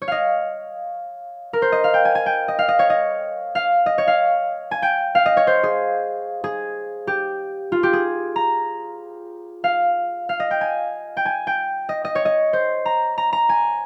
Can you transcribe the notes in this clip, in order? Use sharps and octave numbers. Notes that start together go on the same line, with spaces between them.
C#5
D#5 F5
A#4
C5
D#5
F5
G5
G#5
G#5
G5
D#5
F5
D#5
C#5
D#5
F5
D#5
C#5
F5
G#5
G5
F5
D#5
C#5
C5
G#4
G#4
G4
F4
G4
G#4
A#5
F5
F5
D#5
G5
G#5
G5
G#5
G5
D#5
D#5
C#5
D#5
C5
A#5
A#5
A#5
G#5